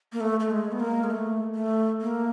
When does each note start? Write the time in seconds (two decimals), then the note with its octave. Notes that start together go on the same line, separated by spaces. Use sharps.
0.13 A#3
0.20 A3
0.40 A3
0.51 G#3
0.72 B3
0.80 A#3
1.04 G#3
1.10 A3
1.55 A3
2.01 A#3